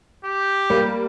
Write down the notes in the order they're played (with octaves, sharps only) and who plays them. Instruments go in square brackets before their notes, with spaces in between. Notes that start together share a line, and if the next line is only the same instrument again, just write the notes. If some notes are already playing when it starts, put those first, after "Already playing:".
[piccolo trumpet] G4
[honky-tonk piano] G3 A#3